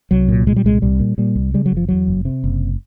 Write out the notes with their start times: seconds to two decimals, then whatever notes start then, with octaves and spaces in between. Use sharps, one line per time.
0.11 C2 F#3
0.29 A#2
0.47 A#2 G#3
0.56 G3
0.65 C2 G#3
0.82 C2 G3
1.00 A#2
1.18 A#2 G3
1.36 C2
1.54 C#3 G3
1.66 F#3
1.72 F#1
1.77 F3
1.88 E2 F#3
2.08 F#1
2.25 C3
2.44 F#1